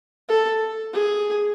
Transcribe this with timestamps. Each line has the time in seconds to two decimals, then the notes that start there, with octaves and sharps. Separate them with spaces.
0.29 A4
0.93 G#4